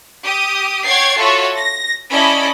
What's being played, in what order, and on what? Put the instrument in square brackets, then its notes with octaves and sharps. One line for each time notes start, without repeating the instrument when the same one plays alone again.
[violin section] G4 D#6
C#5 F#5 G5 G#6 A6 C7
F4 F#4 A4 C#5 E5
A#6
C#4 E4 A4 D5 D#5 B5